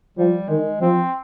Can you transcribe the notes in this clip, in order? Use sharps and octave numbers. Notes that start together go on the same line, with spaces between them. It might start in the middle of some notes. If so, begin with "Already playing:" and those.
F3 G3
D#3 G#3
F3 C4